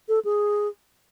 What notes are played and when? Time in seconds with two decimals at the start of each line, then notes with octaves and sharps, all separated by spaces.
0.08 A4
0.24 G#4